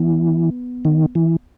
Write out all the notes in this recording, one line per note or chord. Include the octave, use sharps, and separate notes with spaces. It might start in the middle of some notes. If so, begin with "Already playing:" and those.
Already playing: E3 B3
D#3
E3